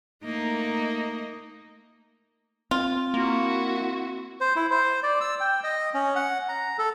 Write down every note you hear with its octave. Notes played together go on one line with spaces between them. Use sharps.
A3 A#3 D#4
C4 F4
A#3 E4 F#4
C5
E4
C5
D5
E6
G5
D#5
C#4
F#5
A#5
A4